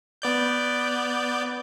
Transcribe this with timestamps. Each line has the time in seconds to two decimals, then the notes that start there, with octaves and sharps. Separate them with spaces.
0.22 B3 D5 G6